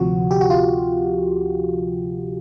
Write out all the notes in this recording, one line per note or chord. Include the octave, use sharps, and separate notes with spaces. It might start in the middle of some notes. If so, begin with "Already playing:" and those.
Already playing: D2 C3 F3 F#4
G4
F#4
F4